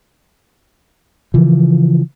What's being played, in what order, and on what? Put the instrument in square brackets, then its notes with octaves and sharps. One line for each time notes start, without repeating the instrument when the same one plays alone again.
[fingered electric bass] C#3 E3 F3